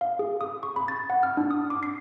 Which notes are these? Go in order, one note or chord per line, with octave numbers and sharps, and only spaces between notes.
F5
G#4
D#6
C#6
B5
A6
F#5
F6
D4
D#6
D6
C7